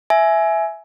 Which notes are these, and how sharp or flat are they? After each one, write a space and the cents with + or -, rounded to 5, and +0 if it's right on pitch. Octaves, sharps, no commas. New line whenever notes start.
E5 +0 G#5 +15